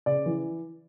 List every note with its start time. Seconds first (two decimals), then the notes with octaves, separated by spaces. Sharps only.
0.06 C#3 D5
0.26 E3